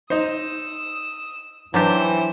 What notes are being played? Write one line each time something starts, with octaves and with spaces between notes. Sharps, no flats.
D#4 C5 D#6 E6
E3 F#3 D4 G4 C5